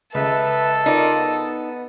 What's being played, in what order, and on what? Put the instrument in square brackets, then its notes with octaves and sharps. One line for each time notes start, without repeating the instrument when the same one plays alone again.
[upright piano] C#2 [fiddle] A4 [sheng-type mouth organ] B4 E5
[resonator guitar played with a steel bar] D#4 [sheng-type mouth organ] F4 A#4 D5
[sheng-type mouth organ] B3